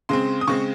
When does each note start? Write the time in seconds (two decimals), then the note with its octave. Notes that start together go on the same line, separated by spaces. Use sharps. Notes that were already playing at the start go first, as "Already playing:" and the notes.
0.09 C#3 G#3 C4 C6
0.41 D#6
0.47 C#3 G#3 C4 C#6